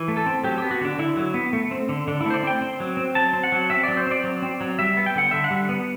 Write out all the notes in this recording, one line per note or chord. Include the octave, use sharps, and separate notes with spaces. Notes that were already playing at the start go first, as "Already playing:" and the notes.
Already playing: E3
A3
A4
C4
F#3 G4
B3 G4
F#4
D3 D4
D3 E4
F#3
B3
A3
C4
D3
D3 D4
E4
A3 C5
D5
C4 G5
C4
F#3
C4
F#3 A5
C4
F#5
F#3
C4 E5
F#3 D5
C5
C4 D5
F#3
C4
F#3
G3 E5
B3
G5
D3 F#5
D3 E5
F#5
G3
B3